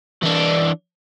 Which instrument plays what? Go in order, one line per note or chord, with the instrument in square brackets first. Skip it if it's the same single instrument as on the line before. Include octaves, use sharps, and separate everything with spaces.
[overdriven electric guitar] E3 D4